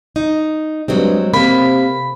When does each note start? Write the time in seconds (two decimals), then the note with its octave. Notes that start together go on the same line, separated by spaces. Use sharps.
0.16 D#4
0.88 G2 F#3 G#3 C4
1.34 C3 A#3 B5